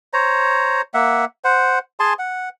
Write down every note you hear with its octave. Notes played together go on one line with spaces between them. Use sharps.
C5 C#5 A#5
A#3 E5 F#5
C5 F#5
G#4 G#5 A5 C6
F#5